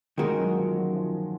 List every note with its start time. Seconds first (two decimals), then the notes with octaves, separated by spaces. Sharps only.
0.18 D#3 G#3 A#3 D#4 F#4 A#4
0.38 F#3
0.57 F3
0.77 F#3
0.95 F3